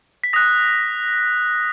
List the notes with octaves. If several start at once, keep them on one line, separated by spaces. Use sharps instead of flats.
B6
D#6 F#6 A#6